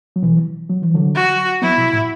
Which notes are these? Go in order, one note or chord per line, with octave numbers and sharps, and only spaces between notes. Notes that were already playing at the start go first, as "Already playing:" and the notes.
F#3
B2 E3
F#3
E3
D3 F#3
F#4
F#3 B3 E4
B2
A2